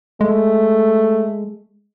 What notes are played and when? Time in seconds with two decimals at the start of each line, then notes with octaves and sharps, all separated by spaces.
0.21 G#3 A3